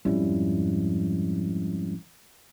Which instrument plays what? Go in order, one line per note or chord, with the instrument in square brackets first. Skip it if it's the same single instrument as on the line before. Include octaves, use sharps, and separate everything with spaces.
[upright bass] F2 G#2 [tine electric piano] G3 C#4 E4